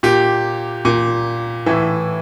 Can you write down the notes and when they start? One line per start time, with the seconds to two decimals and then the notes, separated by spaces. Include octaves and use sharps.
0.03 A#2 G4
0.85 A#2
1.66 A2 E3